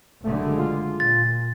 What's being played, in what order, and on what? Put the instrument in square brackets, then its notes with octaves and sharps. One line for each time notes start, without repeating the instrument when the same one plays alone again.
[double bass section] F#1 D3 G#3 [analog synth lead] A3
[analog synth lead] F4
[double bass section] A#2 [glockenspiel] A6